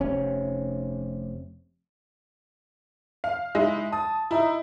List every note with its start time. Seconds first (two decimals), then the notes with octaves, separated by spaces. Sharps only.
0.01 F1 C3 C#4
3.24 F5
3.55 G#3 D#4 E4
3.93 A5 D#6
4.31 D#4 E4 E6